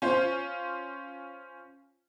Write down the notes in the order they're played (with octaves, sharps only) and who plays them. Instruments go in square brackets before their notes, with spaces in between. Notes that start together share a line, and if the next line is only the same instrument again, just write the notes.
[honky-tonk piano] C#4 F4 C5